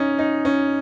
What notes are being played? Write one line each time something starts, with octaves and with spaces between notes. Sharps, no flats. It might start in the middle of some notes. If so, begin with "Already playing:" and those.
Already playing: C#4 D#4
D#4
C#4